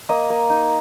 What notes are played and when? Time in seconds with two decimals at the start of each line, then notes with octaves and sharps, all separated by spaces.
0.09 A#3 D#5
0.30 A#3
0.50 D#4